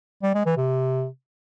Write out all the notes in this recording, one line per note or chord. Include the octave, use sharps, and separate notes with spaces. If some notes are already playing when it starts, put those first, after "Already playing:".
G3
G#3
E3
C3